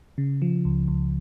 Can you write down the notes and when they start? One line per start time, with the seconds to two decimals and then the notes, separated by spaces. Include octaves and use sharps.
0.18 C#3
0.42 F3
0.65 C#2
0.88 C#2